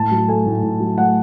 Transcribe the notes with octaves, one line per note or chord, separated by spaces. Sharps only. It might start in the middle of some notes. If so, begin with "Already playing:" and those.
Already playing: A2 A5
F#3
A3 G#5
A2
A2
F#3
A3 F#5